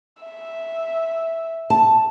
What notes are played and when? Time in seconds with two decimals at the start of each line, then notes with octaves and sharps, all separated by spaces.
0.23 E5
1.70 A5